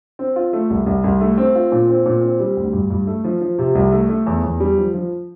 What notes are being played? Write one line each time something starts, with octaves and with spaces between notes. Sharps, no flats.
C4
F4
A3
C2
C2
C2
A3
C4
F4
A#2
C4
A#2
C4
G3
D2
G2
G2
A3
F3
F3
C3
C2
A3
A3
E2
E2
G3
F3
F3